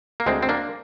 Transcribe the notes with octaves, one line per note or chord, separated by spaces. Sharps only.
A#3
D2 G#3 C4
C4
A#3 D4